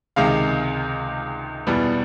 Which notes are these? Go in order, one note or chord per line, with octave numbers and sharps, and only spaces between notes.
C#2 C3 D#3 G#3 F5
E2 B2 G3 B3 E4